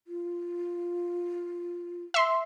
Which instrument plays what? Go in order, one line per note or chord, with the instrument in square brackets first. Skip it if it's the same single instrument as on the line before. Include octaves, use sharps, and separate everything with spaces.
[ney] F4
[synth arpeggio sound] E5 C6